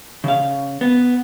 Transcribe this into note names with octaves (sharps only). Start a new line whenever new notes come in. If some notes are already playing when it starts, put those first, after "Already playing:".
C#3 F5
B3